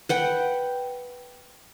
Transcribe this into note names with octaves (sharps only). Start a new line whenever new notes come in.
B4 F#5 G5